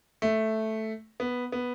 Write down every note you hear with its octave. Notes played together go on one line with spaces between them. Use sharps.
A3
B3
B3